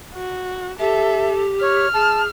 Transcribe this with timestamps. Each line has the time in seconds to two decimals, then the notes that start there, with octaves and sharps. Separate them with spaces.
0.14 F#4
0.79 G4 A4 E5
1.61 C#5 F6
1.94 G#4 A5